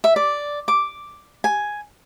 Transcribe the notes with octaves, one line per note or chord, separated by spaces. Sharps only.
E5
D5
D6
G#5